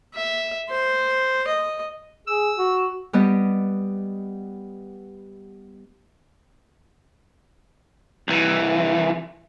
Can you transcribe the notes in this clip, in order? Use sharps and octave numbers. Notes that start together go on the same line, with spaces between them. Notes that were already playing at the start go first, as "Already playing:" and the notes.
E5
C5
D#5
G#4 E6
F#4
G3 B3 G4 D#5
C2 E3